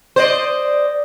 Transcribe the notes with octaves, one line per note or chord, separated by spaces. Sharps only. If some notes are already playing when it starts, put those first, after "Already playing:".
C5 D5 D#5